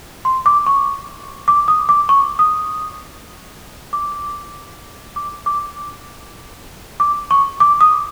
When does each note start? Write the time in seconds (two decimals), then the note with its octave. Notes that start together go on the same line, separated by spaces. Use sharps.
0.25 C6
0.46 D6
0.67 C#6
1.48 D6
1.68 D#6
1.89 D6
2.09 C#6
2.39 D#6
3.93 D6
5.16 D6
5.46 D6
7.00 D6
7.31 C#6
7.60 D6
7.81 D#6